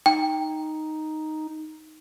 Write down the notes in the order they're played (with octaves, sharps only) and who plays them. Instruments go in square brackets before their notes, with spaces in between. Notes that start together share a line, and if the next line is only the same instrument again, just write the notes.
[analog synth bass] D#4 [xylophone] G5